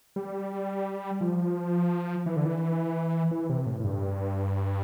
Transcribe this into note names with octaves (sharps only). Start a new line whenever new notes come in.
G3
F3
E3
D3
E3
E3
C3
A2
A2
G2